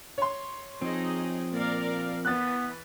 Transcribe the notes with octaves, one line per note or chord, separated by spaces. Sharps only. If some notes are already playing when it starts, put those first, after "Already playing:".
C#5 C6
F3 C4 D#4 G#4 D#5
A#2 A#4 D5 F5
E3 B3 B4 F#6 A6